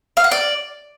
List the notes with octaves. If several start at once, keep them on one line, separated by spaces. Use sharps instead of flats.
F5
F#5
D5